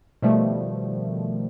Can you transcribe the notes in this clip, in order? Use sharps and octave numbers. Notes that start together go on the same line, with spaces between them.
B2 D#3 F3 G3 A3